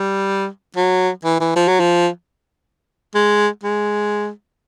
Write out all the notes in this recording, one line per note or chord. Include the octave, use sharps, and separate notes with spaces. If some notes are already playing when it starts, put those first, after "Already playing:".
Already playing: G3
F#3
E3
E3
F3
F#3
F3
G#3
G#3